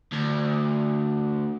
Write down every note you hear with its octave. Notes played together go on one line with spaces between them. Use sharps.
D2